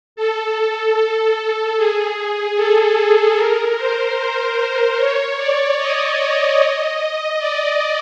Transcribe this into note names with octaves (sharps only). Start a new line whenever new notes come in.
A4
A4
G#4
G#4
A4
A#4
C5
C5
C#5
D5
D#5
D5